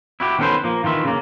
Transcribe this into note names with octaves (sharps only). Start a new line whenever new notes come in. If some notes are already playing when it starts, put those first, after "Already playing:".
E4 F#4 G4
D#3 B3 C#4 A4 B4 C5
F3 A#3
D#3 E3 F4 E5
C#3 A#3